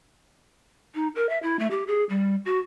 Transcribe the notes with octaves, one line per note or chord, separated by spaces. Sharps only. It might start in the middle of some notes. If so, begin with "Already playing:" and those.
D#4
A#4
E5
E4
A3
G4
G#4
G3
F#4